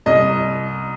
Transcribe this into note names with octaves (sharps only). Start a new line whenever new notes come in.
C2 D#5